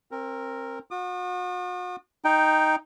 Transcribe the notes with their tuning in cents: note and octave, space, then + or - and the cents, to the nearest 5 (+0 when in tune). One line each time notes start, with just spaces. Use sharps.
C4 +25 A#4 -5
F#4 -40 D#6 -45
D#4 +0 G5 +0